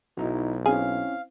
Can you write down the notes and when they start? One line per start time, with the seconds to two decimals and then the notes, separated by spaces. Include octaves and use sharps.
0.17 B1 F#3 D#4 E4
0.66 C4 C#4 E4 G#4 F5